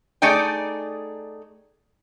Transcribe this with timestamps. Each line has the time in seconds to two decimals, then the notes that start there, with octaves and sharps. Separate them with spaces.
0.22 A3 D#4 G#4 D5 G5